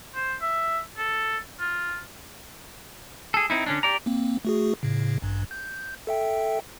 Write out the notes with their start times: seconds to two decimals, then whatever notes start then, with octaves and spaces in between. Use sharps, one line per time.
0.15 C5
0.42 E5
0.97 A4
1.60 F4
3.34 G#4 A4
3.50 C4 D#4 E4
3.66 D3 C#4 D4
3.83 G4 D5 A#5
4.06 A#3 C4
4.45 A3 F#4 G#4
4.83 A2 C#3
5.22 A1 G2
5.51 G6
6.07 A4 E5 G5